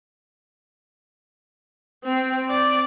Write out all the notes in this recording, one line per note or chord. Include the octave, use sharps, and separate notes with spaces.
C4
D5